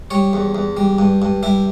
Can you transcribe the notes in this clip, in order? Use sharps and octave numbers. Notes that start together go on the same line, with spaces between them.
G3 C#5
E2
E2
G3
G2
G2
G3 E4